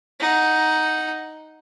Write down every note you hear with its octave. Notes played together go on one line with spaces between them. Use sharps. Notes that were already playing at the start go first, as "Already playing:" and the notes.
D#4 F#5